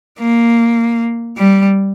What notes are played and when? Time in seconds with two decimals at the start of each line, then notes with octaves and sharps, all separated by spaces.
0.19 A#3
1.37 G3